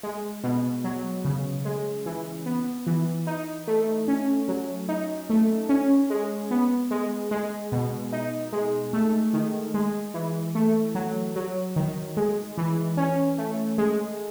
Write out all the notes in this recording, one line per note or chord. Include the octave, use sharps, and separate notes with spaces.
G#3
B2
F#3
C#3
G#3
E3
B3
E3
D#4
A3
C#4
F#3
D#4
A3
C#4
G#3
B3
G#3
G#3
B2
D#4
G#3
A3
D#3
G#3
E3
A3
F#3
F#3
D#3
G#3
E3
C#4
A3
G#3